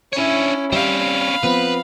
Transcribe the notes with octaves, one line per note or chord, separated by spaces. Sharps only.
C#4 D4 E4 C#5
G3 C4 C#4 F5 B5
F3 B3 C4 B4